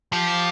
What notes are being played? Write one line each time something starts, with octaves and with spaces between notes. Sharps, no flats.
F3 G4